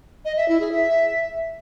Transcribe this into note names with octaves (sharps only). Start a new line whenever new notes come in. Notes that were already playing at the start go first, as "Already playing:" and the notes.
D#5
E5
E4
G#4
E5